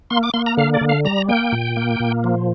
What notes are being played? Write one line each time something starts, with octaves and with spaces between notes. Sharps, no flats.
A#3 C6
D6
A#3 C6
A#5
D3 F5
D5
D3
F5
G3 A#5
A#3 G5
A#2
A#3
A#2
F3